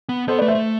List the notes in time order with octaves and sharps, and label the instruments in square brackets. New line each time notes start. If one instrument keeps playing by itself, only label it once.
[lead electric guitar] B3
[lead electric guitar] B3 [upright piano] A4 C5
[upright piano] B4 D5
[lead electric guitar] A3
[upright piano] C5 E5
[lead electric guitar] A3